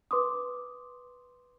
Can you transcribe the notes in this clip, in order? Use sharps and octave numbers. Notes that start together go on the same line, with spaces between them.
B4 C6 D6 D#6